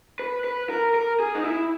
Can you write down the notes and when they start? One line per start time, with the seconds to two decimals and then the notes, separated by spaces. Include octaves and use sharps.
0.19 B4
0.44 B4
0.70 A#4
0.94 A#4
1.20 G#4
1.35 D#4
1.45 E4